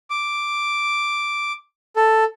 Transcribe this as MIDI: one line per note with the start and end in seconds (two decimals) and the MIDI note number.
0.10 1.53 86
1.96 2.24 69